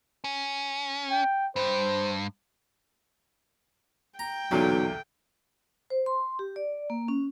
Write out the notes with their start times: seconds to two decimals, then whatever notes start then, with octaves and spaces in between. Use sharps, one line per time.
0.24 C#4
1.11 G5
1.56 G2 C5
4.19 G5 A#5
4.51 B1 E2 A#2 D3 F#3
5.90 C5
6.06 C6
6.39 G4
6.56 D5
6.90 A#3
7.08 C#4